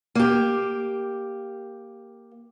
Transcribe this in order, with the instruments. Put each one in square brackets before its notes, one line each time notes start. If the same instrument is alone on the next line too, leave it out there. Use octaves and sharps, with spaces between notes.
[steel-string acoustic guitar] A#3 G4